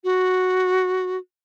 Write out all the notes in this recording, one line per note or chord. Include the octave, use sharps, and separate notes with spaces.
F#4